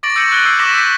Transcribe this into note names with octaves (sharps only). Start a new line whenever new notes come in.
C#6 D6 A6 A#6 D7 F#7
E6 G6 A#6 C#7 D#7 F#7
F#6 G#6 G7
E6 G6 C7 D7
C#6 D6 A#6 B6 E7 G7
E6 B6